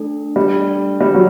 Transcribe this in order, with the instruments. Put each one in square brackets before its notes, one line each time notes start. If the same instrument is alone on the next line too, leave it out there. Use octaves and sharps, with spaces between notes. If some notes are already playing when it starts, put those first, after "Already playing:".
Already playing: [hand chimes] A3 D4 A4
[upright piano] G3
G3
F#3